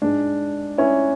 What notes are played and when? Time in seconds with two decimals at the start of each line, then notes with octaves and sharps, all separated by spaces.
0.02 G#2 G#3 D4
0.78 C#4 E4